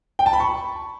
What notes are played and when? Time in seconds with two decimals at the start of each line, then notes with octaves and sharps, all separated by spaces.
0.19 G5
0.26 A5
0.33 B5
0.40 C#6